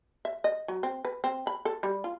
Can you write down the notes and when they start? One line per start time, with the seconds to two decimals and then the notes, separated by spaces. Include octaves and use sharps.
0.25 E5
0.44 D#5
0.68 F#3
0.83 C4
1.05 B4
1.24 C4
1.47 B5
1.65 A4
1.83 G3
2.04 F4